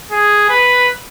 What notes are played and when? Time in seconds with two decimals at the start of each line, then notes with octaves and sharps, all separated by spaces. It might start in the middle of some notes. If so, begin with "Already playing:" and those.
0.12 G#4
0.49 B4